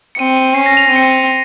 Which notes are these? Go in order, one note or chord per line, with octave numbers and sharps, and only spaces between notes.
C#7
C4 D#7
D#7
C#4 C7
A#6
F7
C4 D#7
C#7
D#7